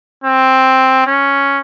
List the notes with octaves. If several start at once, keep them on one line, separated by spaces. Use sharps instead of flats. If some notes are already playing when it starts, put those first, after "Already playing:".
C4
C#4